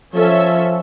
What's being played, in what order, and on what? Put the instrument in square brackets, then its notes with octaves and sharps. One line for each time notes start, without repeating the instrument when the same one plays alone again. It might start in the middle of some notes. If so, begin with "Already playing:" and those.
[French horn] F3 [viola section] C#4 A4 E5